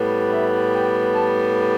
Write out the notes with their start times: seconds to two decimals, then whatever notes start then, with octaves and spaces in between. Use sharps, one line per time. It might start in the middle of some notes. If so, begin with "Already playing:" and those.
Already playing: A2 G3 B3
0.33 E5
0.73 G5
1.13 A5